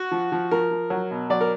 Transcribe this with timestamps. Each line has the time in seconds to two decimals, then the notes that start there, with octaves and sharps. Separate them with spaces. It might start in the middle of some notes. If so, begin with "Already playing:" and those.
Already playing: F#4
0.11 F3
0.32 F3
0.51 F3 A#4
0.71 F3
0.90 F#3
1.11 B2
1.30 F#3 D5
1.41 A#4